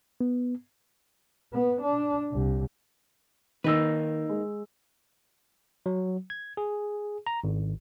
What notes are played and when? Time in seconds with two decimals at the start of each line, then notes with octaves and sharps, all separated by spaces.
0.21 B3
1.53 B3
1.82 D4
2.32 C2
3.64 D#3 A#3 D#4 B4 E6
4.29 G#3
5.86 F#3
6.30 G#6
6.57 G#4
7.27 A#5
7.44 G#1